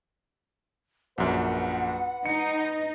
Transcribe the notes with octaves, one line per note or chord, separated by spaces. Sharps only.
A#1 F#2 B4 F#5
D#4 C#7